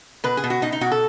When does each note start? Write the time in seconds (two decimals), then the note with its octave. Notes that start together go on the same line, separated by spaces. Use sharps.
0.24 B2 B4
0.37 G#4
0.44 B2
0.50 F#4
0.62 B2 D#4
0.72 D#4
0.81 B2 F#4
0.92 A4